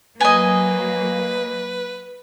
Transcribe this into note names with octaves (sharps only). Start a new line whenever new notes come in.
F#3 A#3 B4 D#5 G#5